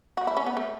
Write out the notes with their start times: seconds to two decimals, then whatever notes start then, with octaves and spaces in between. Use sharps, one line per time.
0.17 F#4
0.27 E4
0.37 C#4
0.46 B3
0.57 A3